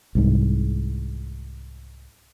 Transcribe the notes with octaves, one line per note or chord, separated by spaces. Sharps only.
C2 G#2